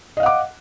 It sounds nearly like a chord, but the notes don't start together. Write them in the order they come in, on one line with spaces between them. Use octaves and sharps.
D#5 F5 F#5 D6